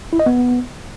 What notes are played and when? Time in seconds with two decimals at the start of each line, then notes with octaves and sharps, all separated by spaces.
0.13 E4
0.19 D#5
0.26 B3